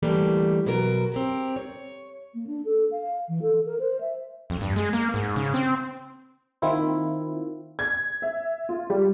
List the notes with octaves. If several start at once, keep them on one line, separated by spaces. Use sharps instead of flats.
D3 E3 G3 A3 A#3
B2 F#3 F#4 A#4
C4 G4 A#4
C#5
A#3
D4
A4
F5
E3
A4
A#4
C5
E5
F2
G2
G#3
A#3
G#2
C#3
C4
D#3 A#3 C4 E4 F4
G#6
E5
F4
G3